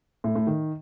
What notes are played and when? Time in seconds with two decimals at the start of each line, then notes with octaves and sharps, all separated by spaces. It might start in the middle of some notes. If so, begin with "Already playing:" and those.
0.24 A2
0.35 A2
0.47 D#3